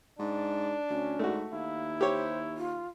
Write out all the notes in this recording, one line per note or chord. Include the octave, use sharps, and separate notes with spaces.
G#2 D4
D2 C#4
G#2 A3 F#4
D#2 E4 F5
G4 C5 C#5
F4